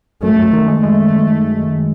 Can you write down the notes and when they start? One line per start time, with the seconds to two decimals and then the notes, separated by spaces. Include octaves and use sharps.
0.22 F#2 A3
0.38 F#2
0.53 D#3
0.68 G#3 A3
0.83 G#3